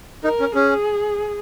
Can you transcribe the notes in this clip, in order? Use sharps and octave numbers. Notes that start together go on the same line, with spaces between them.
D#4 A#4
C#4
C#4 G#4